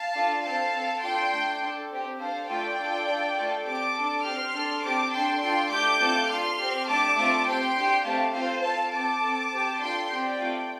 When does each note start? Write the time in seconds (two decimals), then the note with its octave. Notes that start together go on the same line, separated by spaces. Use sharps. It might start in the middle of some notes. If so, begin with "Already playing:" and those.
Already playing: F5 A5
0.15 D4 F4 A4
0.43 C4 A4 F5 A5
0.73 C4 A4
1.02 D4 F4 A4 G5 C6
1.32 A3 D4 A4
1.60 D4 A4
1.90 C4 G4
2.19 D4 A4 C5 F5
2.48 A3 F4 A4 D5 G5
2.78 D4 F4 A4
3.07 D4 F4 A4
3.37 A3 F4 A4
3.66 C4 G4 A5 D6
3.95 D4 A4
4.24 C4 G4 C6 F6
4.53 D4 A4
4.83 C4 G4 A5 D6
5.12 D4 A4 G5 C6
5.41 D4 F4 A4 G5 C6
5.71 A3 D4 G4 D6 G6
5.99 A3 C4 F4 A4
6.28 D4 F4 A4 C6 F6
6.59 C4 G4
6.87 A3 D4 G4 A5 D6
7.16 A3 C4 F4 A4
7.46 C4 G4 G5 C6
7.75 D4 G4
8.04 A3 C4 G4 F5 A5
8.33 C4 F4 A4 C5 F5
8.63 C4 F4 A4 F5 A5
8.92 C4 A4 A5 D6
9.21 C4 A4
9.51 C4 G4
9.79 D4 F4 A4 G5 C6
10.09 C4 G4 D5 G5
10.38 A3 C4 F4